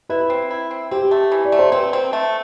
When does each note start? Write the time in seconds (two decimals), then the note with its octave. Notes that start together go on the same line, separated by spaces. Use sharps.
0.09 E4 B4
0.30 C4
0.50 E4
0.71 C4
0.91 C4 G4
1.11 A3
1.32 E3
1.45 D5
1.52 A3
1.59 C5
1.72 C4 B4
1.93 C4
2.13 A3